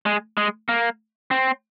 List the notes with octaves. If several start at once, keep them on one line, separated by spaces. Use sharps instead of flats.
G#3
G#3
A#3
C4